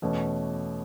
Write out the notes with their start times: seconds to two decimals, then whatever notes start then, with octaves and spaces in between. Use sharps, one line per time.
0.02 E2 B2 A3 C#4